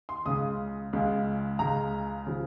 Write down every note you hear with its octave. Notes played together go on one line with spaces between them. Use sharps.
C6
C#2 C#3 G#3 D#6
C#2 C#3 G#3
C#2 C#3 G#3 A#5
C#3 F3